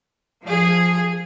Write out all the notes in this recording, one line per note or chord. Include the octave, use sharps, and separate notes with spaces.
F3 G#4